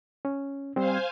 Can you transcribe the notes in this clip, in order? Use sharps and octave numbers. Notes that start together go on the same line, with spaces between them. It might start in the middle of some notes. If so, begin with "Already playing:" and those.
C#4
G3 C4 C5 F5 G#5